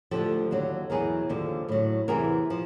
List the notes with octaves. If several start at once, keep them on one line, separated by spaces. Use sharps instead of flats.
D2 D3 F3 G4 A4
D#2 D3 F#3
E2 B2 F#3 G#4 A#4
D#2 D3 F3
A2 F#3
E2 C3 E3 G#4 A#4
F3